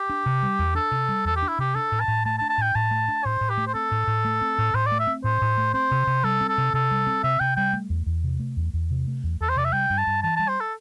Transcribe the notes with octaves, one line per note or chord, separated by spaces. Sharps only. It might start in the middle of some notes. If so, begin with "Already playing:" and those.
Already playing: G4
D4
C3
G3
E2
D4 A4
C3
G3
E2 A4
G4
D4
E4
C3 G4
D4 A4
A2
A5
A2
A3 A5
A5
D4
A5
A2 G5
A2 A5
A3
D4
A2 C5
A2
G4
A3
C5
C4 A4
A2
A2
A3
C4
A2
A2 C5
D5
A3
E5
C4
A2 C5
A2
A3
C4 C5
C3
C3
G3 A4
C4
A4
C3
C3 A4
G3
C4
C3 E5
C3 G5
G3 G5
A3
E2
E2
C3
A3
E2
E2
C3
A3
E2
E2 A4
C5
C3 D5
E5
G3 G5
G2
A5
G2
E3 A5
G3 A5
C5
A4